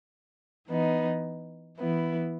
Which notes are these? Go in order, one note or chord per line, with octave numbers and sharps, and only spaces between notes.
E3 B3 D#4
E3 B3 E4